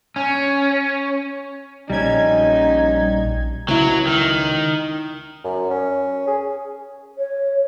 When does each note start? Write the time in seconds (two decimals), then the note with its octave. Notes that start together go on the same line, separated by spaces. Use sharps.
0.16 C#4
1.90 A#1 G3 C#4 D#4 G#6
3.68 C#2 F#3 E4
4.07 D#3
5.44 F#2
5.70 C#4
6.27 G#4
7.18 C#5